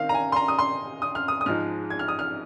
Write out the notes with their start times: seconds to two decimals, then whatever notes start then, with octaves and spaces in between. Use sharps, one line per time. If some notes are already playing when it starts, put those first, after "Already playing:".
Already playing: D#3 C4 D#4 F5
0.09 A#5
0.14 G#5
0.32 C6
0.36 A#5
0.48 D#6
0.59 C6
1.02 D#6
1.15 F6
1.28 D#6
1.41 D#6
1.46 G#2 F3 G#3 D#4 F6
1.90 G#6
1.99 F6
2.08 D#6
2.19 F6